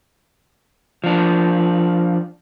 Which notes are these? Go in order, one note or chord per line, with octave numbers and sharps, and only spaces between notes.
F3 D4